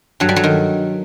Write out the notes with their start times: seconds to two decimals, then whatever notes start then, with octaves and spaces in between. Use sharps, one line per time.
0.20 G2 F#3
0.29 G3
0.36 F#3
0.44 D#3